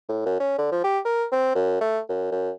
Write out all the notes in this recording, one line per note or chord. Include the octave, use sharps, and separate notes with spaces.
A2
F#2
C#4
D3
F3
G4
A#4
C4
F#2
A3
F#2
F#2